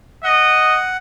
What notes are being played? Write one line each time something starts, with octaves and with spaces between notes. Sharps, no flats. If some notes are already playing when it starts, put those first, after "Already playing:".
D#5 F#5